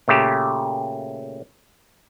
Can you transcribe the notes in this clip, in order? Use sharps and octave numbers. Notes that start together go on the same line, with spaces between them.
A#2 C#3 A3 G4